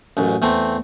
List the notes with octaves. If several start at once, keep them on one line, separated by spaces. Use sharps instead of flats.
A1 F#2
E2 A3 C4